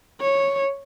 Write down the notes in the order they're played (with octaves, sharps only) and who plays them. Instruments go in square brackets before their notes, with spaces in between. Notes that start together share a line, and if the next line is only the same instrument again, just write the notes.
[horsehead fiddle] C#5